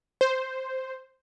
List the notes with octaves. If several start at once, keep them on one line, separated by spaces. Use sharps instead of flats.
C5